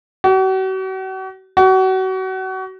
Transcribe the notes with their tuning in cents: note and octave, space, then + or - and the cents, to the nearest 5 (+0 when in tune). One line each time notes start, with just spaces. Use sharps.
F#4 +40
F#4 +30